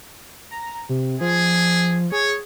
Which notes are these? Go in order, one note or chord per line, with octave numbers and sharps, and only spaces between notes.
A#5
C3
F3 G#4
G#4 C#5